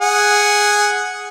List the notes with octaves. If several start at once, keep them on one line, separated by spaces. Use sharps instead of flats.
G#4 F#5